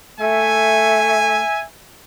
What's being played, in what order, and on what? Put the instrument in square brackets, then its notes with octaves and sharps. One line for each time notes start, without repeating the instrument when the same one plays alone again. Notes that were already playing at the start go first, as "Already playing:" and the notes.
[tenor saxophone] A3 [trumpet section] E5 G#5